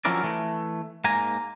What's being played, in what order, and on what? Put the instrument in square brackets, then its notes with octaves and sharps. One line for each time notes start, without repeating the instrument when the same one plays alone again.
[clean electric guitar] F3 F#3 C#4 E4 A#4 D5
E3 A3
G#2 A#3 G#5 A#5